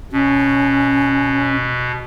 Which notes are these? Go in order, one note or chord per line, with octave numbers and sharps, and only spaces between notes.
B2 C#4